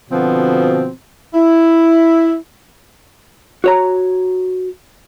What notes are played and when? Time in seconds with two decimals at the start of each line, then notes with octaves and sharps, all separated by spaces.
0.10 B2 D3 F3 B3 C4 F#4
1.34 E4
3.64 F#4 C#5 A#5